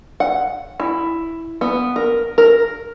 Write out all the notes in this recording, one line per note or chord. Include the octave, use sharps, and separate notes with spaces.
F#5
E4
B3
A#4
A#4